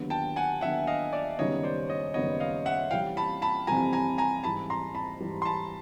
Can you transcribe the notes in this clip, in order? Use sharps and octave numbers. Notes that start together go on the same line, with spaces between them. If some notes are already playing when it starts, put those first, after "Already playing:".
Already playing: D#2 D3 F#3 B3 D4
G5 A5
F#5 G#5
D#2 D3 F#3 B3 D4 E5 F#5
D#5 F5
D5 E5
F#1 F#2 D#3 G3 B3 C#5 D#5
C5 D5
C#5 D#5
F#1 F#2 D#3 G3 B3 C#5 D#5
D#5 F5
E5 F#5
F2 C3 E3 G3 F5 G5
A5 B5
A5 B5
F2 C3 E3 G3 G#5 A#5
G#5 A#5
G#5 A#5
G#2 E3 G3 A5 B5
A#5 C6
A5 B5
G#2 E3 G3
C6
A5 B5